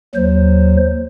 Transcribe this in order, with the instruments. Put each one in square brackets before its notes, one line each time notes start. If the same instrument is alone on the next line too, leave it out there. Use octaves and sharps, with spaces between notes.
[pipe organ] D#2 F#3 C5